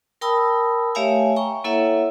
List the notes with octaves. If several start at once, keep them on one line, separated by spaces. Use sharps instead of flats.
A#4 G5 A5 B5 D#6 E6
A3 G4 C#5 E5 F5 G#5
G5 A#5 C#6
A#3 E4 A4 C#5 E5 F#5